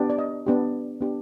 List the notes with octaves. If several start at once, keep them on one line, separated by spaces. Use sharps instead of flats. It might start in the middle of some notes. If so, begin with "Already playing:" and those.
Already playing: B3 D4 G4
D5
D#5
B3 D4 G4
B3 D4 G4